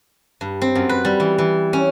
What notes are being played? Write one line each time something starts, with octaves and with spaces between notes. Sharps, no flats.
G2
C4
F#2
B4
G3
E3
E3
C#4